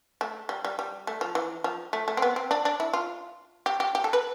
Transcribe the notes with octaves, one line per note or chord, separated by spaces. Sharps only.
A3
G3
G3
G3
A3
F3
E3
F3
A3
A3
C4
B3
C4
D4
D4
E4
F4
G4
G4
G4
A4
B4